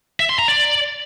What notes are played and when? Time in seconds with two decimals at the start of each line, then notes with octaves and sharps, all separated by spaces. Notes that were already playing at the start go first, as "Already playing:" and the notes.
0.20 E5
0.29 C6
0.39 A#5
0.48 D5